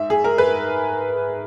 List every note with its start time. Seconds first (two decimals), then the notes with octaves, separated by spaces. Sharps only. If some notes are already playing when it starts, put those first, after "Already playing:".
Already playing: G#2 E5
0.10 G#4
0.24 A#4
0.38 B4